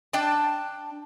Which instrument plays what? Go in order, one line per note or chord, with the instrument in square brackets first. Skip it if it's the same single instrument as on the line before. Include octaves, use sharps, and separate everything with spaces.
[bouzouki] D4 G5 A5